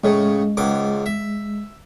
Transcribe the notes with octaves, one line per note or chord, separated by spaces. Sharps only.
A2 C#3 G#3
C#2 G#2 D6
E5